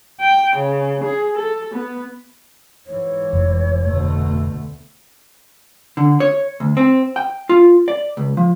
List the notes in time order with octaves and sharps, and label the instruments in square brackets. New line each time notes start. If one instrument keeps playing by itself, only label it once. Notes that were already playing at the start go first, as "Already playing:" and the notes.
[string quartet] G5
C#3
G#4
A4
B3
[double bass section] G#2 E3 [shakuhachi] C#5
[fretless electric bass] F1
[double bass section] D2 B2 A3
[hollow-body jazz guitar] D3
C#5
D2
C4
G5
F4
D5
C#2
F3